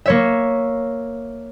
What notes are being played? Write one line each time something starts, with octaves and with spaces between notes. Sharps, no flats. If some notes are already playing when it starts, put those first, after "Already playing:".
A#3 C#5 E5